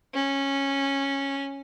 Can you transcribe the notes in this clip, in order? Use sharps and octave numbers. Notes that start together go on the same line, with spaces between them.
C#4